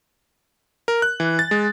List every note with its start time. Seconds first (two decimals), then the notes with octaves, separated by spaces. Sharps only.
0.88 A#4
1.02 F#6
1.20 E3
1.39 A6
1.51 G#3